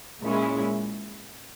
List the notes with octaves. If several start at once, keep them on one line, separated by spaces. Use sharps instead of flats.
A#2 G#3 C#4 E4